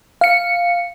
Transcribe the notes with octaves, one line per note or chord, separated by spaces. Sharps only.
F5 C#7